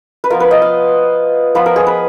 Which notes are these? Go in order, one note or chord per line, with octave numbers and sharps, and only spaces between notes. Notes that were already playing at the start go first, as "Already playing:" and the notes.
B4
F3 B3 F4 A#4
B4
D#5
F5
F3 B3 F4 B4
A#4
G#4
B4